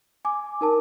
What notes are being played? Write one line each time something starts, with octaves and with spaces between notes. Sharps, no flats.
G#5 D6
D#4 A#4 A5